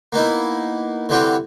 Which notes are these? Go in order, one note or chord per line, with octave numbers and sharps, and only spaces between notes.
A#3 B3 D#4 E4
D3 E3 G3 C4 F#4 G4